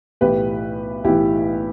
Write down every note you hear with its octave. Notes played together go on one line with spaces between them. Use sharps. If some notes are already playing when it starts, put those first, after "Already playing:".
B1 A2 E3 G4 B4
B1 A2 E3 E4 G4